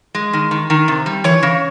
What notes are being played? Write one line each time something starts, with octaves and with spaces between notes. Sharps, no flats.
G#3
D#3
D#3
D#3
C3
G3
E3 C#5
C#3